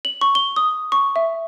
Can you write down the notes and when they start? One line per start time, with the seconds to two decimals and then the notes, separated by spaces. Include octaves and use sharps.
0.05 F#7
0.21 C#6
0.35 G7
0.56 D#6
0.92 C#6
1.16 E5